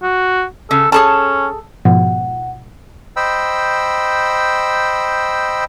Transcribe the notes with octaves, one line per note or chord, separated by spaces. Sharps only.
F#4
C#3 A4
C#4 G#4 A4 A5
G#2 B2 F3 F#5
C5 D#5 G5 B5 E6